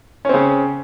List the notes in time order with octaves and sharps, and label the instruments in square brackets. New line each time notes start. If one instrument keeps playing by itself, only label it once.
[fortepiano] C#4
C4
C#3